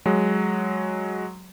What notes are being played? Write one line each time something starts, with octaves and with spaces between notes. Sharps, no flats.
F#3 G#3